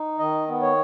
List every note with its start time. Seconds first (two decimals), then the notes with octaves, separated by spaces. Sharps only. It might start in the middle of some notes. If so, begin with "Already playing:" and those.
Already playing: D#4
0.19 D#3 D#5
0.48 B3
0.62 C#5